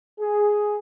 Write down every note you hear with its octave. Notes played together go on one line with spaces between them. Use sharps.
G#4